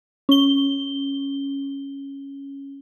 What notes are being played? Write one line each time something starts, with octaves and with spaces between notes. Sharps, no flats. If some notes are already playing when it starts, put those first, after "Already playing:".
C#4 G7